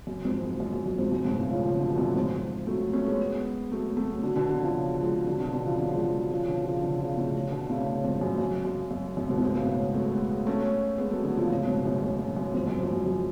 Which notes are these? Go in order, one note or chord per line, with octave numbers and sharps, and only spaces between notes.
F#2
F2 G#2
F#2
F#2
F#2
F#2
F2 G#2
F#2 A2
G#2 B2
A2 C#3
C#3 F3
C#3 F3
D3 F#3
B2
F#2 A2
F2 G#2
F#3 A3
A3 C#4
G#3 B3
F#3 A3
F#3 A3
D3 F#3
B2 D3
B2 D3
C#3 F3
F3 G#3
D3 F#3
B2 D3
B2 D3
C#3 F3
D3 F#3
F3 G#3
F3 G#3
D3 F#3
C#3 F3
B2 D3
C#3 F3
D3 F#3
C#3 F3
A2 C#3
B2 D3
A2 C#3
F2 G#2
F#2
F#2
F#2
F#2
F#2 A2
G#2 B2
A2
G#2 B2
A2 C#3
G#3 B3
F#3 A3
G#3 B3
A3 C#4
G#3 B3
F#3 A3
D3 F#3
C#3 F3
A2 C#3
G#2 B2
F#2 A2
F#2
F#2
F#2
F2 G#2
F#2
F2
F#2
F#2